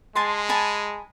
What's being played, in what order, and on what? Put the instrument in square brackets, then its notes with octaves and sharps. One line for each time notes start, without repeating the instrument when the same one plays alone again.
[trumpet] G#3 [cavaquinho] G#5 A5 C6
[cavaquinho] G#5 A5 B5